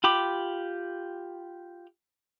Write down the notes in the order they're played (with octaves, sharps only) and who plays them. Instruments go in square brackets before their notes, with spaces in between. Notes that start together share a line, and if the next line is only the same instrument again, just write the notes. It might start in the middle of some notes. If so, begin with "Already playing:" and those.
[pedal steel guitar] F4 G4 B5 D6